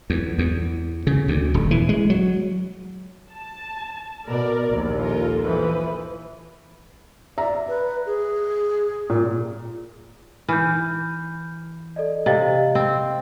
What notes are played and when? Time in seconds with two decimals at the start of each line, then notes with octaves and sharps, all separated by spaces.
0.10 E2
0.39 E2
1.07 C#3
1.28 D2
1.54 D#1
1.71 E3
1.89 G#3
2.10 F#3
3.34 A5
4.27 B2 A#4 D5
4.67 A#1 D#2 D5
4.98 F4 A4 A#4
5.44 E3 F3 B4
7.38 D5 E5 A#5
7.68 B4
8.06 G#4
9.10 A#2
10.48 E3 F6 G6
11.96 A4 D5 D#5
12.26 C3 D#5 F5 A6
12.75 C4